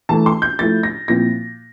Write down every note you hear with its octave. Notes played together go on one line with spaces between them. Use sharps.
E3 A3 E4 A5
C6
G6
F3 A3 E4 A6
A#6
A#2 F3 C4 E4 A#6